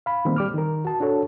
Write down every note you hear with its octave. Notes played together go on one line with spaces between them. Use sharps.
F5 B5
D#3 G3 A#3 C4
G3 D6 F6
D#3 A#4
F#4 A5
D4 F#4 A4 C#5